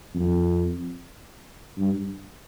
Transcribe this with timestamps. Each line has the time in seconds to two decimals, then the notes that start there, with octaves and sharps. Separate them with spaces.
0.15 F2
1.78 G2